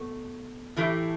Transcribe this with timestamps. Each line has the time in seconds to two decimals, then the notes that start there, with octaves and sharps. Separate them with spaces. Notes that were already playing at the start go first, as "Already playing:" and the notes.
Already playing: B2 A3
0.76 A2 E3 A3 E4 G4